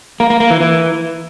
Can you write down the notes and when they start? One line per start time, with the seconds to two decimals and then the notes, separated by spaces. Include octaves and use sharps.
0.20 A#3
0.30 A#3
0.40 A#3
0.50 E3
0.60 E3